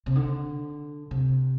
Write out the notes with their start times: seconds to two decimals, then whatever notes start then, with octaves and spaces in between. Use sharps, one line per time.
0.06 C3
0.16 D3
1.11 C3